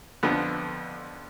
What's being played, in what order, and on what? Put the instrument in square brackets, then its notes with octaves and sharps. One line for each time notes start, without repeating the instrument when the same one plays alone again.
[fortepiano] F2 D3 F3 B3